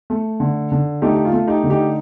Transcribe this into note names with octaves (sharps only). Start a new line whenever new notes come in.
A3
D3
D3
A3 D#4 G4
G4
F4
A3
D#4 G4
D3
D#4 G4